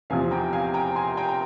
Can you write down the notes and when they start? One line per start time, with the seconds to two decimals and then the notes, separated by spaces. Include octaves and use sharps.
0.10 E2 C3 F3 F5 G#5
0.31 G5 A#5
0.53 F5 G#5
0.74 G5 A#5
0.96 G#5 C6
1.17 G5 A#5
1.29 A#5